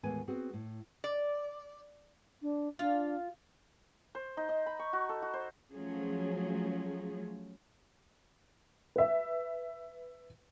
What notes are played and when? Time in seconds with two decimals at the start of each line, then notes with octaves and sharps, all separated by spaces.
0.03 D#2 A2 E3 G#3 B3 G#5
0.27 B3 C4 F#4 G#4
0.53 A2
1.04 D5
2.42 D4
2.79 D4 F4 F5
4.15 C5
4.37 D#4
4.49 D#4
4.66 B5
4.79 C#6
4.93 F#4
5.09 A4
5.22 F#4
5.33 C5
5.73 F3 F#3 A3 C#4 G#4
8.96 B4 E5